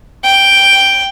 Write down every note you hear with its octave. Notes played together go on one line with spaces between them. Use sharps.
G5